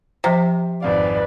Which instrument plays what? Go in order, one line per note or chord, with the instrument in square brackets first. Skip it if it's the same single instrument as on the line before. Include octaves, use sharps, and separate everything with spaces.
[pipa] C3 [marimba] F3 A#5
[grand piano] G#1 F2 F5 [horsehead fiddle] B4 D5